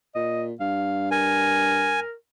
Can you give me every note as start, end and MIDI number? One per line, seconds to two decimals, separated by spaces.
0.15 0.53 46
0.15 0.44 75
0.60 2.04 43
0.60 1.09 77
1.11 2.13 70
1.11 2.00 80